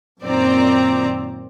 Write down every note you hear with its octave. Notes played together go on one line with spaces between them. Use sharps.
F#2 A#2 D#3 C4 D5 A#5